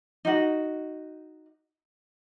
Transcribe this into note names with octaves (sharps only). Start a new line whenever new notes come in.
D#4 F#4